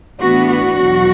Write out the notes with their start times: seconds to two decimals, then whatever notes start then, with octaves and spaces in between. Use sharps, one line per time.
0.20 A2 E3 B3 D4 F#4
0.49 F#4
0.78 E2 B2 F#3